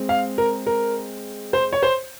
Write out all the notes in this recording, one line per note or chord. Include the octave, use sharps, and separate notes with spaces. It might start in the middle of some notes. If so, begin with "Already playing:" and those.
Already playing: G#3 C4
F5
A#4
A#4
C5
C#5
C5